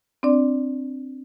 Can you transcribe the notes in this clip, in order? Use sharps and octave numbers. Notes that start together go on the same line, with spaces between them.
C4 D4 D5